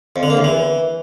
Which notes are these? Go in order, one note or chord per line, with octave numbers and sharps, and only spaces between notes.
F2
D3
A#3
E2
E3